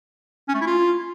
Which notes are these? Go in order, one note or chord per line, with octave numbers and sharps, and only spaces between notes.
C#4
A3
E4
F4